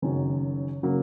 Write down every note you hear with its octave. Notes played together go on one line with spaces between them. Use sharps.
F#1 F#2 D#3 F#3
C#3 F#3 A#3